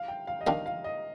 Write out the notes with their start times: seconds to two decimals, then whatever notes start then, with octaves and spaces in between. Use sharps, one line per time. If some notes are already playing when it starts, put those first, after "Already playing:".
Already playing: F5
0.08 G5
0.27 F5
0.41 D#5
0.47 D#3 G3 D4 F4 F5
0.66 F5
0.84 D#5